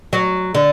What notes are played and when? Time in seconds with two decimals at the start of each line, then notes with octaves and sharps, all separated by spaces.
0.13 F#3
0.54 D3